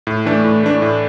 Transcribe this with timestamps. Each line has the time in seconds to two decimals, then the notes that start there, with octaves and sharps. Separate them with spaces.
0.07 A2
0.26 E3 A3 D4
0.45 A2
0.63 E3 A3 D4
0.82 A2